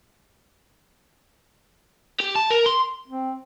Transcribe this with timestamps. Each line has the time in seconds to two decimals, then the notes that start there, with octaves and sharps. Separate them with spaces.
2.20 G4
2.36 A5
2.51 A#4
2.66 C6
3.08 C4